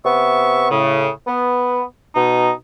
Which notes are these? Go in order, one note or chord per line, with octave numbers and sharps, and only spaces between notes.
C3 B3 E5 C#6
A2 C#3
B3
B2 D#4